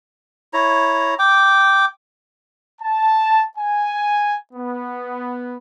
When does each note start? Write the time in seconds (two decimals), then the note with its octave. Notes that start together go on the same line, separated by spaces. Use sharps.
0.53 E4 C#5 A#5
1.19 G5 D6
2.82 A5
3.57 G#5
4.54 B3